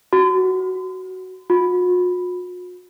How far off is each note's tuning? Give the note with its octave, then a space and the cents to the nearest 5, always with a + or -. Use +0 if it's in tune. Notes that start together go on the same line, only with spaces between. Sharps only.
F#4 +10
F#4 -45